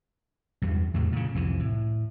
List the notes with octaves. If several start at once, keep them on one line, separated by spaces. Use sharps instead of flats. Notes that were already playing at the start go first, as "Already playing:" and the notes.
E2 G2
E2 A2 C3 F#3
A#2 C#3
C2 F2 E3
A2